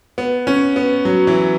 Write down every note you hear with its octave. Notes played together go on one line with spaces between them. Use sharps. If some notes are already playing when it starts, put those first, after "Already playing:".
B3
C#4
B3
F#3
E3